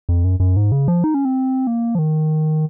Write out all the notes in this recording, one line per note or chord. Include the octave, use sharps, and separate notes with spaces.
F2
F#2
F#2
G#2
C#3
F3
D#4
C#4
C4
A#3
F3
D#3